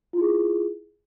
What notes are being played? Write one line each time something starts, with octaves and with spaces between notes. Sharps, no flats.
E4 F4 G#4